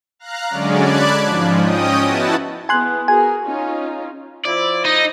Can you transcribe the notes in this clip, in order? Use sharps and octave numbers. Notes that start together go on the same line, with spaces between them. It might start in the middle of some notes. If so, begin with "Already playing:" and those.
F5 A#5 F#6
D3 F#3 G#3 C#4 D5
D5 A5 B5 F#6 G#6
G#2 F3
C#4 D#5 G5 D#6
B3 E4 F#4 A5
B3 E4 G#4 G#5 C6 F#6
F#4 G#4 A#4 G#5
C#4 D#4 F4
F3 E4 D5
D#4 D#5